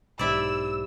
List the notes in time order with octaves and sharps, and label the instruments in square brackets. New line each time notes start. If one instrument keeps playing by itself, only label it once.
[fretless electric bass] B1 G#2 [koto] E4 D5 [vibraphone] G4 C5 [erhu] E6